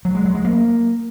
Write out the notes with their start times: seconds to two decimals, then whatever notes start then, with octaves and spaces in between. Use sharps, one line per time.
0.05 F#3
0.15 G#3
0.25 F#3
0.35 G#3
0.45 A#3